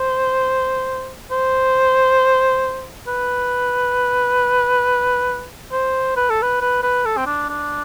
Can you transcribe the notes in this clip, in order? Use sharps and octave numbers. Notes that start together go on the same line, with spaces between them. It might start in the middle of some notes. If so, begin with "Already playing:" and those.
Already playing: C5
C5
B4
C5
B4
A4
B4
B4
B4
A4
C4
D4
D4